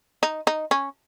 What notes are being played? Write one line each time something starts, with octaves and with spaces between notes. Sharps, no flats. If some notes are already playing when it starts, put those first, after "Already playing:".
D#4
D#4
C#4